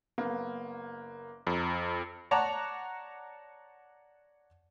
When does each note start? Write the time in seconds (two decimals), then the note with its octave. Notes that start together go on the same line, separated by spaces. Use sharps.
0.18 F#1 A#3 B3
1.47 F2 A#5
2.31 C#5 D5 F#5 A5 A#5 D6